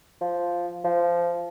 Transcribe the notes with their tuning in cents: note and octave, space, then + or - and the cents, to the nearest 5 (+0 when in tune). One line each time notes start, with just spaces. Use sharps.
F3 +0
F3 -15